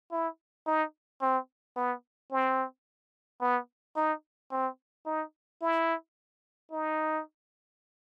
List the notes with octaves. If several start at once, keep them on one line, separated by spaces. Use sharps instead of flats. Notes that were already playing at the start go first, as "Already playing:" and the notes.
E4
D#4
C4
B3
C4
B3
D#4
C4
D#4
E4
D#4